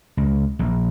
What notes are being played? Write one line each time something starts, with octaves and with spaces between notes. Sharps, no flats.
C#2
A#1